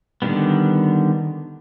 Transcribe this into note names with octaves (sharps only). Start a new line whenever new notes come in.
D3 D#3 G3 B3